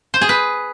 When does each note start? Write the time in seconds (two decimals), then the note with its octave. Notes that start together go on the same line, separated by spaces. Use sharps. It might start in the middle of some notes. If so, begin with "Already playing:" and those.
0.14 C5
0.21 G#4
0.29 B4